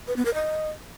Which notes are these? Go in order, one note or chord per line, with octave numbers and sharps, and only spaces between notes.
B4
B3
A#4
D#5